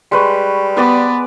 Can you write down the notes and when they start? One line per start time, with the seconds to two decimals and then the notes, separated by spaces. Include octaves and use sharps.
0.12 G3 G#3 B4 C#6
0.77 B3 B4 D5 D6